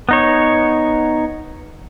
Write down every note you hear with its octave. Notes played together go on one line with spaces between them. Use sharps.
B3 D#4 C#5